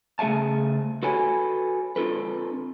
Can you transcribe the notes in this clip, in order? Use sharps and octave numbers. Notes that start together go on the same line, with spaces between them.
C#3 A3 G#4 E5 F5 A5
F#4 A4 B4 C#5 G#5
C4 D4 F4 A4 B4